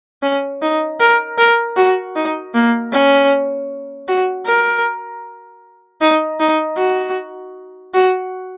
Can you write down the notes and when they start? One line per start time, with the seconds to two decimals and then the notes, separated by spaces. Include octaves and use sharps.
0.22 C#4
0.62 D#4
1.00 A#4
1.38 A#4
1.77 F#4
2.16 D#4
2.54 A#3
2.92 C#4
4.08 F#4
4.46 A#4
6.01 D#4
6.40 D#4
6.77 F#4
7.94 F#4